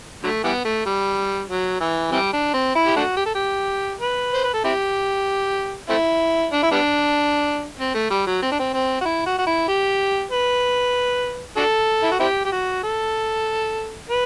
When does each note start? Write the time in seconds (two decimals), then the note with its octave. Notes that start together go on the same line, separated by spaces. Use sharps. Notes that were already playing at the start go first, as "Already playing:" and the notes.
0.23 D3 F#3 A3
0.44 E3 G3 B3
0.65 A3
0.86 G3
1.49 F#3
1.80 E3
2.12 C3 E3 G3
2.33 D4
2.53 C4
2.75 E4
2.86 G4
2.96 A3 D4 F#4
3.17 G4
3.26 A4
3.35 G4
4.01 B4
4.33 C5
4.44 B4
4.54 A4
4.64 C4 E4 G4
5.89 A3 C4 E4
6.52 D4
6.62 E4
6.72 G3 B3 D4
7.79 C4
7.94 A3
8.10 G3
8.27 F#3
8.43 C4
8.52 D4
8.59 C4
8.74 C4
9.01 F#4
9.05 E4
9.26 F#4
9.38 F#4
9.46 E4
9.68 G4
10.31 B4
11.57 D4 F#4 A4
12.03 E4
12.11 F#4
12.20 C4 E4 G4
12.45 G4
12.52 F#4
12.83 A4
14.10 B4